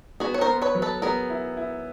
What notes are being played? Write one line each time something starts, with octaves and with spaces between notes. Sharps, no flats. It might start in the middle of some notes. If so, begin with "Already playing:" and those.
B3 F#4 G#4
C#5
A#4 C5
B3
B4 C#5
F#3
A4 B4
B3 G#4 A#4
E4
E4